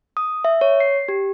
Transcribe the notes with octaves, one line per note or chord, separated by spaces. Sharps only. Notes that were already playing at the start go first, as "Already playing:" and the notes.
D#6
E5
C#5
C7
G4